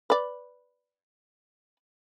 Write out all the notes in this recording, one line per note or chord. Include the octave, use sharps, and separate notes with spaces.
B4 D5